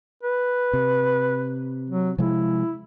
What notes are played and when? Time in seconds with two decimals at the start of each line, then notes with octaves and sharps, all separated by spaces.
0.23 B4
0.73 C3
1.90 F#3
2.18 C3 F3 G#3 E4